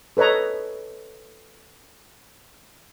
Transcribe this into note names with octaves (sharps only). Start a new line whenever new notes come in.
A4 B4 C#5 D#5 A#5